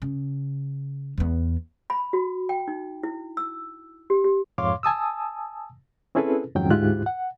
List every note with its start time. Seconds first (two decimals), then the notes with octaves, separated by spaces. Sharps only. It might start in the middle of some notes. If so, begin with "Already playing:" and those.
0.02 C#3
1.18 E2 B3
1.90 B5
2.13 F#4
2.49 G5
2.68 D#4
3.03 E4
3.37 E6
4.10 G4
4.24 G4
4.58 F2 G#2 C#5 F5 C6 D6
4.83 G#5 A5 D#6 E6
6.15 C4 C#4 E4 G#4 A4 B4
6.55 F2 G#2 D#3 F#3 C#4 G5
6.71 D2 G#2 E4 F4 G4 F#6
7.06 F#5